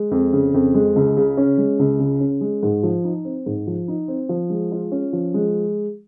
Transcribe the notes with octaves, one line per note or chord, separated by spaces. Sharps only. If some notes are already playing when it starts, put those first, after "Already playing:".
Already playing: G#3
F2
C#3
F2
G#3
C#2
C#3
C#4
G#3
C#2
C#3
C#4
G#3
G#2
F3
D#4
C4
G#2
F3
D#4
C4
F3
G#3
F4
C#4
F3
G#3